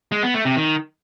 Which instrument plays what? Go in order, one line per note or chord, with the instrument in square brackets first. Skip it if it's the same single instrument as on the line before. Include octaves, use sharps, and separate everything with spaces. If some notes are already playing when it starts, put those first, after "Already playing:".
[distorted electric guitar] G#3
B3
A3
C3
D#3